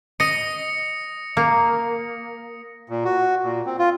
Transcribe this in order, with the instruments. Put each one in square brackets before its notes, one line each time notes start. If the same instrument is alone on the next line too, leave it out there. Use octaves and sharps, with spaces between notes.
[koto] D#5 [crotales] D#6 A#6 C#7
[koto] A#3
[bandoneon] A#2
F#4
A#2
C4
F4